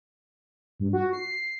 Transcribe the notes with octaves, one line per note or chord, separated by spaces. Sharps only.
G2
F#4
C7